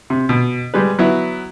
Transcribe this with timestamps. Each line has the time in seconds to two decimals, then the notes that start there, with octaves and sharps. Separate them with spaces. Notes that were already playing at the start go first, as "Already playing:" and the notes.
0.10 C3
0.29 B2
0.74 G3 G#3 B4
0.99 F#3 B3 E4